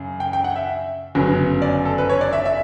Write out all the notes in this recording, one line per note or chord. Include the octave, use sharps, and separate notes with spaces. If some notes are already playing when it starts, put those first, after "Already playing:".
Already playing: F#2 C#3
G5
G5
F#5
E5
G1 F#2 C#3 F#3 B3
D5
A4
B4
C#5
D5
E5
E5